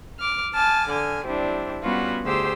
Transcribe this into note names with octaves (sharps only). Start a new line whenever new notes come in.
D6 F6
G#5 A5 D6 F6
D3 G#5 F6
G3 C4 D4 E4
G3 B3 C#4 F4 F#4
D2 G4 G#4 C5 C6 E6